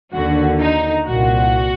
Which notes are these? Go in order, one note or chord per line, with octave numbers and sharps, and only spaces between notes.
D#2 D3 F#4
D#4
C2 A#2 F#4